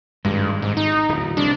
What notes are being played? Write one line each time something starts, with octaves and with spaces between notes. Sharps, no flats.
G#1 G2 G#3
G#2
D#4
D1 E2
C2 A2 D4